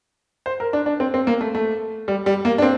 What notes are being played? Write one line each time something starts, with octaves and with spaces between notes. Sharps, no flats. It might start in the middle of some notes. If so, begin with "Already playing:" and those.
C5
A#4
D4
D4
C4
C4
A#3
A3
A3
G3
G3
A#3
D4
C4